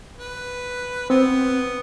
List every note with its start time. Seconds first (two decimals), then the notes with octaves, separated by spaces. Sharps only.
0.19 B4
1.10 B3 C4